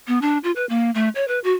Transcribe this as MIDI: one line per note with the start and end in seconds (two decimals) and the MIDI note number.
0.07 0.21 59
0.21 0.38 62
0.44 0.51 65
0.56 0.65 71
0.69 0.91 58
0.94 1.09 57
1.15 1.26 73
1.28 1.39 71
1.44 1.53 66